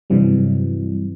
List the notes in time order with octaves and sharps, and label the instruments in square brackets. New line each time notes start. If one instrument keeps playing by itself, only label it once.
[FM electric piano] G2 C3 E3 F#3 G3